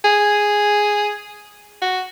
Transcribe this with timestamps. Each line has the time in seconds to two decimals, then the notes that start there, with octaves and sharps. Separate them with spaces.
0.04 G#4
1.82 F#4